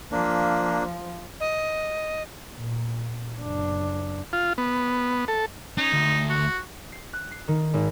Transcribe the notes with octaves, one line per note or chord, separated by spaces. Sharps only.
F3 A#3 D4
D#5
A#2
F#1 D4
F4
B3
A4
C#4 D#4
D2
F#4
C7
F#6
C7
D#3
G#1